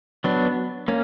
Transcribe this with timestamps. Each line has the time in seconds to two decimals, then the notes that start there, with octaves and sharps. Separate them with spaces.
0.24 F#3 B3 D4
0.88 A#3 C#4